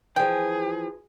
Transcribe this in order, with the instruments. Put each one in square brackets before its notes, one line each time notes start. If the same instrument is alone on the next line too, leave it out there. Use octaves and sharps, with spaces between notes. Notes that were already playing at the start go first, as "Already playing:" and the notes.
[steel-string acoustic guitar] E3 F3 [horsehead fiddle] G#4 [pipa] G5